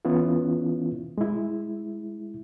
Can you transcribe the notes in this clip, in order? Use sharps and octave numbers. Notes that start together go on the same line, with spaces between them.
E3 B3 C#4 E4 F4
G#3 E4